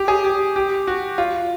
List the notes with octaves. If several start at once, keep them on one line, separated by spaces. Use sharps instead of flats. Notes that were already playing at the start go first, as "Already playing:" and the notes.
Already playing: G4
G#4
G4
G4
F#4
F4